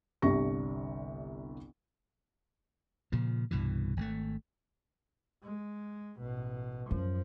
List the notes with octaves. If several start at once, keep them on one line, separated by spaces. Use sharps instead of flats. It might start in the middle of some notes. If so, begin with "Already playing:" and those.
G1 C2 D3 G4 C#6 A#6
A#2 C#3 F3
C2 G2 B2 E3
G#1 D3 A3
G#3
A1 B2
F#2 F3